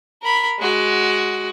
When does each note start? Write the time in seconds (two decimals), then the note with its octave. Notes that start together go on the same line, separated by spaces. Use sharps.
0.23 A#4 B5
0.59 G#3 F#4